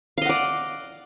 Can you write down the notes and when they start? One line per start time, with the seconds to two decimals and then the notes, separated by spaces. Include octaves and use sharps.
0.18 F5
0.22 D#5
0.25 F#5
0.29 D5